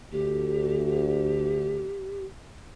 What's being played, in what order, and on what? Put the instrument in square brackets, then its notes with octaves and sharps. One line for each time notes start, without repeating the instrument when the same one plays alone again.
[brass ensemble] D2 [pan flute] G4